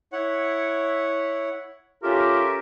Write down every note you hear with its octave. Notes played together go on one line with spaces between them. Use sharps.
E4 C#5 F#5
C#4 F4 G4 A4 A#4 E5